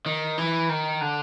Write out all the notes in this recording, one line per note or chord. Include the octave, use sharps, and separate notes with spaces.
D#3
E3
D#3
D3